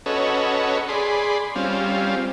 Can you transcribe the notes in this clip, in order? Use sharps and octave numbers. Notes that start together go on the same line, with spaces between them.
C#4 F#4 A4 B4 C#5 D#5
G#4 D5 B5 C6
G3 C4 C#4 F4